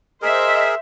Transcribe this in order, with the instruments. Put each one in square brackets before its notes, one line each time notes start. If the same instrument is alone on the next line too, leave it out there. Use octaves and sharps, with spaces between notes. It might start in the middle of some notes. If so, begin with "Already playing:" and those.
[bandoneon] G#4 A#4 [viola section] C5 E5 [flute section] D#5